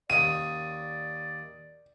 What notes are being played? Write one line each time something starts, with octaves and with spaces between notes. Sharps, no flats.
D#2 C#4 D5 D#5 D#7